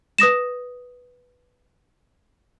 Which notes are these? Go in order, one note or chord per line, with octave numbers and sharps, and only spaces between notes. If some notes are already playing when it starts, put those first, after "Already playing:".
B4 D#6 A#6 E7